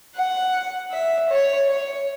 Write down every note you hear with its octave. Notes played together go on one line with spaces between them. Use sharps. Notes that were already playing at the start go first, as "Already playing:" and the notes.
F#5
E5
C#5
C#5